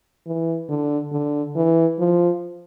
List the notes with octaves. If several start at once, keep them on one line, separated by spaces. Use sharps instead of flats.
E3
D3
D3
E3
F3